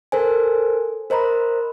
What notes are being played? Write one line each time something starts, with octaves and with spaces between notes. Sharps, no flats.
A4 A#4 C5 G#5
A#4 C5 D#5 A#5 B5